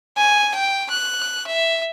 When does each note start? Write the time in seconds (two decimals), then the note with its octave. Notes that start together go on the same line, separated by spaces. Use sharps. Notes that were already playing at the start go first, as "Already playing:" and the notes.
0.17 G#5
0.55 G5
0.90 F#6
1.47 E5